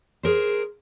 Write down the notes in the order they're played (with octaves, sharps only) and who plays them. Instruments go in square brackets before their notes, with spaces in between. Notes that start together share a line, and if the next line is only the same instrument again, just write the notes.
[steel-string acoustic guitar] G#4 A#4 C5